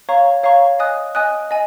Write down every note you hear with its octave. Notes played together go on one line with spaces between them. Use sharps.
C#5 F5 A#5 C#6
C#5 F5 A#5 C#6
D#5 G#5 D#6 F#6
D#5 G#5 D#6 F#6
D#5 G#5